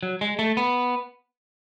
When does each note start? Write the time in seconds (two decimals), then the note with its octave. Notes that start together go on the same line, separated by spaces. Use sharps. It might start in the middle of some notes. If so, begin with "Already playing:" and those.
0.03 F#3
0.21 G#3
0.39 A3
0.57 B3